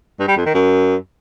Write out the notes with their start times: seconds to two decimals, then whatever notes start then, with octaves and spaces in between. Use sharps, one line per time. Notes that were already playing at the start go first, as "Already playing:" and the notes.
0.19 G2
0.28 G3
0.37 F2
0.46 D#3
0.54 F#2